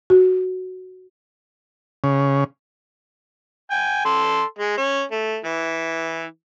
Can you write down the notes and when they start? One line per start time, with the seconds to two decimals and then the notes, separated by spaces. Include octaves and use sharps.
0.10 F#4
2.04 C#3
3.71 G5 G#5
4.05 A4 C6
4.59 G#3
4.78 C#4
5.12 A3
5.45 E3